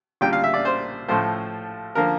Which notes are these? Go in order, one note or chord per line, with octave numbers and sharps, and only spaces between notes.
A#1 A#2 G3 G5
F5
E5
D5
C5
A2 F3 A3 C5
D3 F3 A#3 A#4